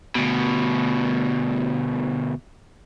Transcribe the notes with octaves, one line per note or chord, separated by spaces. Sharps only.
D2 B2